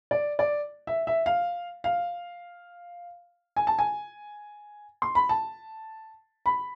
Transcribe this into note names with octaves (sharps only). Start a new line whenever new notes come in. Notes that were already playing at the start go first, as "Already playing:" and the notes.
D5
D5
E5
E5
F5
F5
G#5
A5
G#5
C6
B5
A5
B5